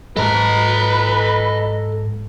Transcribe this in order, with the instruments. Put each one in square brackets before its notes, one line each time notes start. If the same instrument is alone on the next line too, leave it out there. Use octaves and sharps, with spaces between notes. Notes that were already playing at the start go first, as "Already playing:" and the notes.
[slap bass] G#2 F#3 [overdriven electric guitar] A4 A#5 [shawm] B4 [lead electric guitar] D#5 A5